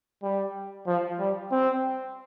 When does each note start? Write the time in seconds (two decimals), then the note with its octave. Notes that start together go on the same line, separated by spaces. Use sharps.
0.23 G3
0.87 F3
1.20 G3
1.51 C4